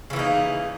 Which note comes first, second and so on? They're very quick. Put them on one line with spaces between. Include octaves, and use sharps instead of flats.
C#3 E3 A#3 D#4